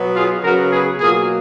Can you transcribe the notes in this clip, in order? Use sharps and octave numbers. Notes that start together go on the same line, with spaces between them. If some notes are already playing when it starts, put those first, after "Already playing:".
Already playing: B2 F#3 B3
F4 G#4
C#3 F#3 B3 F#4 A#4
G#4 B4
B2 F#3 A#3 F4 G#4